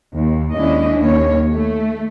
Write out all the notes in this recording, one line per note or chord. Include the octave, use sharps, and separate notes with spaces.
D#2
D#2 G#3 C#4 D4 E4 D#5
D#2 A#3 C#5
A3